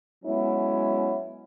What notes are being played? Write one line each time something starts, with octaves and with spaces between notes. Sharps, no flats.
F#3 G#3 B3 C#4 E4